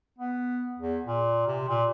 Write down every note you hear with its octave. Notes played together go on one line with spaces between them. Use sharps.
B3
E2
A#2
C3
A#2